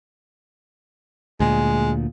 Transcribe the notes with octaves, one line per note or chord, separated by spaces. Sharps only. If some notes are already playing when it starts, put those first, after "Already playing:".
D2 A#2 G#3